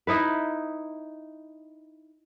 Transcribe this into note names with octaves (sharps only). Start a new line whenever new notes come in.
D#4 E4 B4